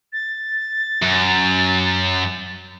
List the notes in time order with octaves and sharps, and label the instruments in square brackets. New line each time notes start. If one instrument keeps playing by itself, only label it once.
[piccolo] A6
[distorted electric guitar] F#2